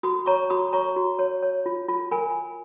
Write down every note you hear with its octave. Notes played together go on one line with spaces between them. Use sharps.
F#4 B5 D#6
C#5 A#5 C#6
F#4 B5 D#6
C#5 A#5 C#6
F#4
C#5
C#5
F4
F4
A#4 G#5 B5